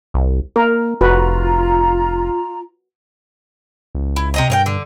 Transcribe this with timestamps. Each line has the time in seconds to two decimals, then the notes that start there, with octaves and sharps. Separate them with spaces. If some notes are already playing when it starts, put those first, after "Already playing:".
0.14 C2
0.56 A#3 A#4
1.01 F1 F4 F#4 B4 A#5
3.95 C#2
4.16 E4
4.34 C3 D#5 A#5
4.50 G2 A#4 C#5 G5
4.66 D3